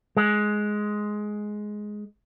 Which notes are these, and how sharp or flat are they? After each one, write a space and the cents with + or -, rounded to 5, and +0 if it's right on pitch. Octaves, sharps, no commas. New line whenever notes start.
G#3 +10